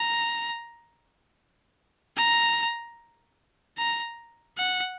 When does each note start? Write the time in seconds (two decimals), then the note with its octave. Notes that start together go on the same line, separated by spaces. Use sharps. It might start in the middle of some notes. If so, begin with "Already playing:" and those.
Already playing: A#5
2.17 A#5
3.77 A#5
4.58 F#5